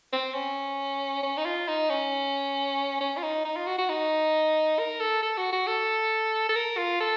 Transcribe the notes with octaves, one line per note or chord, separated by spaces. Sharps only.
C4
C#4
C#4
D#4
F4
D#4
C#4
C#4
F4
D#4
D#4
F4
F#4
F#4
D#4
A#4
A4
A4
F#4
F#4
A4
A4
A#4
F4
A4